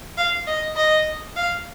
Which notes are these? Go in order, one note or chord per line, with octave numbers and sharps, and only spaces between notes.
F5
D#5
D#5
F5